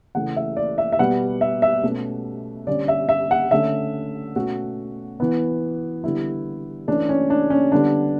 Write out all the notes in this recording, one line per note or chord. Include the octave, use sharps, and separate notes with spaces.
C#3 E3 A3 F#5
E5
D5
E5
E5
B2 G3 B3 F#5
E5
E5
B2 A3 C#4
D3 G3 C#4 D5
E5
E5
F#5
D3 A3 C#4 E5
B2 A3 C#4 F#4
E3 B3
D3 G3 B3 E4
E3 A3 C#4 D4
C#4
D4
C#4
D3 G3 B3 D4